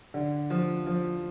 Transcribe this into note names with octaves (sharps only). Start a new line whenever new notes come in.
D3
F3
F3